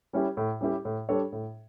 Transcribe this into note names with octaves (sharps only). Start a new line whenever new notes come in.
G3 C#4 E4 G4
A2
G3 C#4 E4 G4
A2
G3 D4 A4 C#5
A2